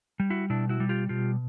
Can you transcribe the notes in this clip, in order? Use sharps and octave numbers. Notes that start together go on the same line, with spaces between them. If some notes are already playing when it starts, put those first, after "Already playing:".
G3
E4 F#4
B2 D4 E4
E4 F#4
G3
F4 G4
B2 F4 G4